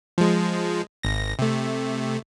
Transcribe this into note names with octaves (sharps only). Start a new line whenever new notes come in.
F3 G#3
G#1 A#6
C3 A3